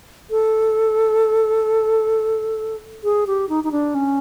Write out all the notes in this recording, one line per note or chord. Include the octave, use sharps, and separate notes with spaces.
A4
G#4
G4
D#4
D#4
D4
C#4